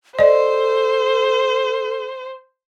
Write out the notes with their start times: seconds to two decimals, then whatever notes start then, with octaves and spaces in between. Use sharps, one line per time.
0.19 A4 C5 D5 D#5